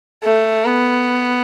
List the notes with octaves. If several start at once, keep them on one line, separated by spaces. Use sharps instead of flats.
A3
B3